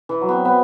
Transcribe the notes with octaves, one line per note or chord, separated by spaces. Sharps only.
E3
F#3
B3 C4
B3